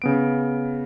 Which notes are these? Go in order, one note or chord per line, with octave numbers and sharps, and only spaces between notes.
C#3 B3 D7